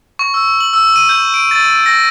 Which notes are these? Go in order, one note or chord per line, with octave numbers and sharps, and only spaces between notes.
C#6
E6
F#7
E6
D#7
G6
D7
A6
A#6